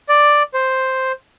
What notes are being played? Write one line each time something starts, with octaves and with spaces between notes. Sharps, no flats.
D5
C5